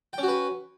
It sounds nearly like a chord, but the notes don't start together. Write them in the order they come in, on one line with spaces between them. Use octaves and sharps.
G5 C#4 F#4 B4